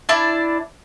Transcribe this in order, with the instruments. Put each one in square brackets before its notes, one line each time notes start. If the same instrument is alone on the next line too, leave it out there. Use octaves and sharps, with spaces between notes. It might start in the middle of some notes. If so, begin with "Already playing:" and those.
[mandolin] D4 E4 D5 A5